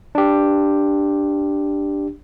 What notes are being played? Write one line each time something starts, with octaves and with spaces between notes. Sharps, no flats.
D4 G4